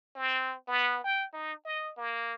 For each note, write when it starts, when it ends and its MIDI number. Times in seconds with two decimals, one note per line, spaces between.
0.16 0.54 60
0.68 1.02 59
1.04 1.24 79
1.34 1.53 63
1.65 1.91 75
1.97 2.34 58